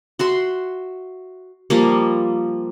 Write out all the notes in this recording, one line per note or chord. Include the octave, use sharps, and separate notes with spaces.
F#4 E5 C6
F3 G3 A#3